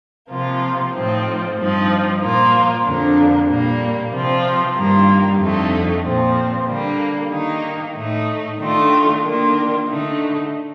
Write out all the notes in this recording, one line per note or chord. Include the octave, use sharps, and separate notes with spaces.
C3 F3 A#3 F4
A2 F3 C4 D#4
G2 F3 C4 D#4
A#2 F3 A#3 F4
F2 D3 F3 A#3 D4
A#2 G3 A#3
C3 F3 C4 F4
G2 D#3 G3 A#3 F4
F2 D3 A3 D#4
A#2 F3 C4
D3 G3 A#3
D#3 A#3 D#4
A2 A3 D#4
D#3 A3 D4 F4
D#3 A#3 D4 F4
D3 A3 D#4